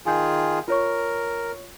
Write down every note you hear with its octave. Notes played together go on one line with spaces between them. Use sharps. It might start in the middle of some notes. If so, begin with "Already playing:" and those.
D#3 F4 G#4 G#5 G6
F4 A#4 C#5 C#6